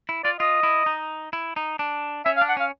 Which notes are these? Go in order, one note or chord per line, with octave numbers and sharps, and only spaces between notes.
E4
F4 D5
F4 D#5
E4
D#4
E4
D#4
D4
C#4 E5
F5
D4
F#5
C#4 F5